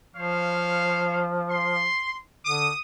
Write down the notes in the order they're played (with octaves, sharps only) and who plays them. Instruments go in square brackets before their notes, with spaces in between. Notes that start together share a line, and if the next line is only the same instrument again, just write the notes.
[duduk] F3 [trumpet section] C5 C#5 F5
[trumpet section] C6
[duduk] D3 [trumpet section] D#6